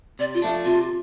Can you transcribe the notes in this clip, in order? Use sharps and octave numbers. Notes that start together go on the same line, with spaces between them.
C3 D5
F4
F3 A3 D4
C3 F4